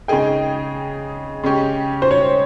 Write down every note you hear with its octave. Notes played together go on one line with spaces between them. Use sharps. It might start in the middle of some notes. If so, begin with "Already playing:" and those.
C#3 G#3 D#4 G#4 G5
C#3 G#3 C#4 G4
C5
C#5